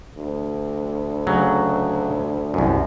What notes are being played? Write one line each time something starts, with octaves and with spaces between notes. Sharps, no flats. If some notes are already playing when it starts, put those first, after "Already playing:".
D2
C#3 F#3 A3
C2 F#2